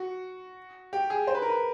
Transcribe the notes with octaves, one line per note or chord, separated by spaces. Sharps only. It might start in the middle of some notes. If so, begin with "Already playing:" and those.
Already playing: F#4
G4
G#4
C5
B4
A#4
B4